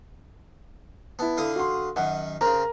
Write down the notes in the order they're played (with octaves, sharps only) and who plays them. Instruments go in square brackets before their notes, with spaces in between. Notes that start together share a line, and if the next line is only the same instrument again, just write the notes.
[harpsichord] B3 [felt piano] E4 A5
[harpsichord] D3 F5 D#6
[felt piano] F#4 C6
[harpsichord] F#2 D#3 [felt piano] F#5
[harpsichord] C#3 C4 [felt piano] A#4 A#5